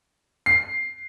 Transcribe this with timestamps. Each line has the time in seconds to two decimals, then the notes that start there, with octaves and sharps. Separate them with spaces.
0.46 C7